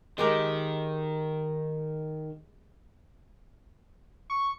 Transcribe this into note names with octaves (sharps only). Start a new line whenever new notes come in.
D#3 G#3 G4 A#4
C#6